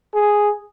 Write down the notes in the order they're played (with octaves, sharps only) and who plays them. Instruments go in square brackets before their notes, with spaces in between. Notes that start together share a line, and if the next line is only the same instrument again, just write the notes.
[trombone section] G#4